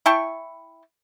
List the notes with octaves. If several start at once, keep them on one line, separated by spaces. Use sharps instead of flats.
E4 G5 A5 C#6